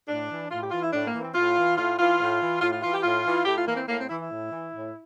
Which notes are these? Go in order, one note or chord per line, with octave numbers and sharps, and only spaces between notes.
A2 D4
E3
A2 F4
G4
E3 F4
E4
A2 D4
A#3
E3
C4
A2 F4
E3
A2 F4
E3 F4
A2
E3
A2 F4
F4
E3 F4
G4
A2 F4
E3
A2 G4
F4
E3 A#3
C4
A2 A#3
C4
E3 E4
E4
A2
E3
A2